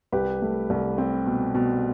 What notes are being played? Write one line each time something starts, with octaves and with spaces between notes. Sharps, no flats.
C2 G4 B4
A3
C2
C4
B2
B2